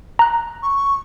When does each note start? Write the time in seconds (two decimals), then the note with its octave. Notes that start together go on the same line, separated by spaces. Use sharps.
0.19 A#5 F#6
0.62 C#6